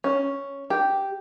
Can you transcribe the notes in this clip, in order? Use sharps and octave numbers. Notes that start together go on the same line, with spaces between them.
C#4
G4